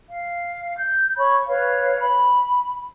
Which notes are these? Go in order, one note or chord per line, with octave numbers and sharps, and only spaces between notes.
F5
G6
C#5 B5 C#6
B4 C#5 F5
B5